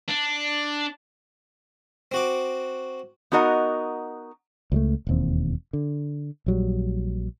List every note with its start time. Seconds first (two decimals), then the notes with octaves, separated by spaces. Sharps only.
0.08 D4
2.11 C4 F#4 D6
3.32 B3 D#4 F#4 A#4 D#5 F#5
4.72 C#2 G3 A3
5.07 E1 D#2 C4
5.73 D3
6.46 A#1 F#3 G3